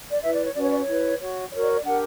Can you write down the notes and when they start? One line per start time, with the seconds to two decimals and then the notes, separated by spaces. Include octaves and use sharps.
0.12 D5
0.22 B4 E5
0.25 E4
0.33 D5
0.44 C#5
0.54 C#4 F#4 B4 D5
0.62 C#5
0.70 D5
0.78 C#5
0.87 E4 B4
1.19 F#4 C#5
1.51 F#4 A#4 C#5 D5
1.62 D5
1.73 D5
1.83 D4 G4 A#4 F#5